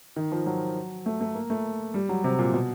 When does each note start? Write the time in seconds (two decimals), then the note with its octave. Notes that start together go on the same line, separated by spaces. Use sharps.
0.16 D#3
0.32 F3
0.46 F#3
1.06 A3
1.21 A3
1.35 A#3
1.50 A3
1.94 G3
2.09 F#3
2.24 C3
2.38 A#2
2.53 B2